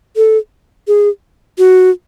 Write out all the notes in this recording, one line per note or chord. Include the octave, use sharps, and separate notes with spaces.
A4
G#4
F#4